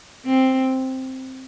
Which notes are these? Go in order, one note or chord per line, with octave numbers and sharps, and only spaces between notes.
C4